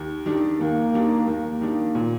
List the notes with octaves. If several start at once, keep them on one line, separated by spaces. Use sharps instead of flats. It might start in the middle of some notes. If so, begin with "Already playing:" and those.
Already playing: D#2
D#3 G3 D4
D#2 A#3
D#3 G3 D4
D#2 A#3
D#3 G3 D4
A#2